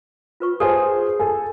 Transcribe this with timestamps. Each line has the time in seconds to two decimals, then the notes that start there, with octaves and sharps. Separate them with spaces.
0.40 F4 B4 C#6
0.60 G#4 B4 C5 A5 D#6
1.20 A4 G#5